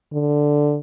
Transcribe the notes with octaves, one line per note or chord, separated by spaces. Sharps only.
D3